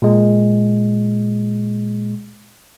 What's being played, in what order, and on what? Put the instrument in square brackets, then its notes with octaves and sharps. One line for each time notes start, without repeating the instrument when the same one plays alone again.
[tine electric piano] A#2 G#3